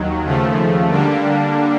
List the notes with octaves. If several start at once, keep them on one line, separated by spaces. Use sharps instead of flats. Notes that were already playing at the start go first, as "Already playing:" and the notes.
Already playing: D#2 D#3 F#3
D#2 C#3 F3 A3
D3 G3 A#3 D4